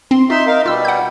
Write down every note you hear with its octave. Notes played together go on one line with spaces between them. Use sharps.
C4 C6
D#4 F4 E5 C6
D#4 A#4 F5
B2 G3 F4 E6
F#5 G6